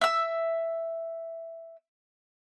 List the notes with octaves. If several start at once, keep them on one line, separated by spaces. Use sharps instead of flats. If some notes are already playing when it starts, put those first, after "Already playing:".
E5 E6